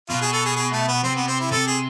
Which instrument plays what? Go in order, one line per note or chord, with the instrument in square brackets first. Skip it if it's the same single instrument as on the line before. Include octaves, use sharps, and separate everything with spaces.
[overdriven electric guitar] B2 [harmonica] F4
[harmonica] G#4
A4
G#4
G#4
A3
B3
[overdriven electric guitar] C3 [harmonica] C4
[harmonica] B3
C4
E4
[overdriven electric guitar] C3 [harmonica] A4
[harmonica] G#4